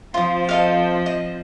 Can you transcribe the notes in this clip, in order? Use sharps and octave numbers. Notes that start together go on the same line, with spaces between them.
F3 C4 F4 C5 D#6
A4 D#5 F5
D#5